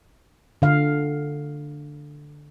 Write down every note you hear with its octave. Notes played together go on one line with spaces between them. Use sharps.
D3 F5